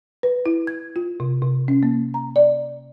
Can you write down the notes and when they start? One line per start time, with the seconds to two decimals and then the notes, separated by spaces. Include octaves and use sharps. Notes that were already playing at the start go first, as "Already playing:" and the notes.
0.23 B4
0.46 E4
0.67 G#6
0.96 F4
1.20 C3
1.42 C3
1.68 C#4
1.83 A#3
2.14 A#5
2.36 D5